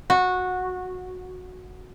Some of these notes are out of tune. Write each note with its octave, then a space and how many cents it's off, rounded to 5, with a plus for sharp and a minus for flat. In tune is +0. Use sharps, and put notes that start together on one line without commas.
F#4 -15